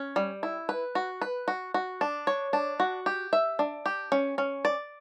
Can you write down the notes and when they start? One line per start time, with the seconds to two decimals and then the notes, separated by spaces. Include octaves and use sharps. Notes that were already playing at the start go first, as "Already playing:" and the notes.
Already playing: C#4
0.16 G3
0.43 E4
0.69 B4
0.95 F#4
1.22 B4
1.48 F#4
1.74 F#4
2.01 D4
2.27 C#5
2.53 D4
2.80 F#4
3.06 G4
3.33 E5
3.59 D4
3.86 G4
4.12 C#4
4.38 C#4
4.65 D5